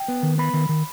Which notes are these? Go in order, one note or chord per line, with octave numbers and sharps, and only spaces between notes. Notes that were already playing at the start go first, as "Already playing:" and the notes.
Already playing: G5
B3
D#3
B3 B5
D#3
D#3